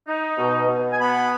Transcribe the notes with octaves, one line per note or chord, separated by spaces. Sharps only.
D#4
B2
B2
G#5
B3 B5